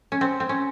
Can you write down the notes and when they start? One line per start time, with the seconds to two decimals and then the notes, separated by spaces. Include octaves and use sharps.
0.12 C#4
0.21 C4
0.40 C4
0.49 C#4